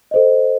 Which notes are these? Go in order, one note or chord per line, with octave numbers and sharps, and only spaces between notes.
A4 C5 D#5